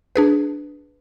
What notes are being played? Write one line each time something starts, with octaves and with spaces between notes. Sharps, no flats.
D4 G#4 B4